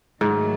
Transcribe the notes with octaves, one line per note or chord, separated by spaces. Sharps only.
G#2 D#3 F#3 A3